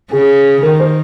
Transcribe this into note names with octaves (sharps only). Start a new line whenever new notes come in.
C#3 G#4
D#3 A#4
C5